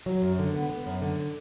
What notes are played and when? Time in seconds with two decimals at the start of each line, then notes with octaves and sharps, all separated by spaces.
0.06 F#3
0.22 F#2
0.39 D3
0.54 B3
0.70 B3
0.86 F#2
1.02 D3